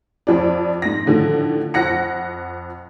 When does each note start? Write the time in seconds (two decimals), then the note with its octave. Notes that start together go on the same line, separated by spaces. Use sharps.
0.27 F2 F3 D5
0.82 G#2 A#6
1.06 A2 D3 D#3 F3
1.74 F2 F#5 A#6 C#7